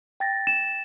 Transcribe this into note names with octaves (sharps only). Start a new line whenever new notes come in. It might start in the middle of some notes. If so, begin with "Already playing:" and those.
G5 A6 A#6
E7